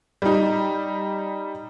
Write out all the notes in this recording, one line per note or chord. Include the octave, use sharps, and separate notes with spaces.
G3 D#4